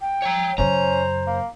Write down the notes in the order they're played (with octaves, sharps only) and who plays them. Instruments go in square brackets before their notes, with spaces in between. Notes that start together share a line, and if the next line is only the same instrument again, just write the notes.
[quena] G5
[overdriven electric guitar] C#5 A#5
[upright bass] F#2 C#3 [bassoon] C#4 [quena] C5 [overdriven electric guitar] A#5
[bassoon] A#3